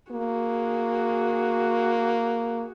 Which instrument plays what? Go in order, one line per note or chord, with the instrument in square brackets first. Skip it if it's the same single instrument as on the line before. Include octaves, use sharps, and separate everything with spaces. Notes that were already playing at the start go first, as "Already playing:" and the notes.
[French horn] A#3 [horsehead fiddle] F#4 G#4